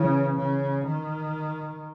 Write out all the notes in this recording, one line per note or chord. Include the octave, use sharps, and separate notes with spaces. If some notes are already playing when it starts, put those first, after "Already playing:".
Already playing: C#3 E3
C#3
D#3